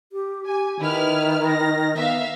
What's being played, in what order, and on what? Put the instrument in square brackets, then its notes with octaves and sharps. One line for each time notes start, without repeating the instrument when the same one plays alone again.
[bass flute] G4
[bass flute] G4 [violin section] G#5
[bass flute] D#3 [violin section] E4 B4 F6
[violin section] A#6
[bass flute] B3 [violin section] E5 F5